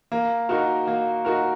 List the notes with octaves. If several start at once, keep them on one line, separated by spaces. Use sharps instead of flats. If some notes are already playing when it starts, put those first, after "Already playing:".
A#3
D#4 F#4 A#4
A#3
D#4 F#4 A#4